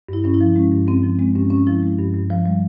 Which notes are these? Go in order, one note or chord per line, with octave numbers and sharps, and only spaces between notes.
G2 E4
G2 C#4
E4
F3
G#3 C#4
G2
G2 C4
F3
G#3 C4
G2 C#4
G2 C#4
F3 E4
G#3
G2
G2
F3
G3